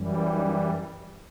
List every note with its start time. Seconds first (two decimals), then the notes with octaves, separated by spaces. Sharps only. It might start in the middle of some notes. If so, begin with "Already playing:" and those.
Already playing: F#2 E3 G3
0.30 D#4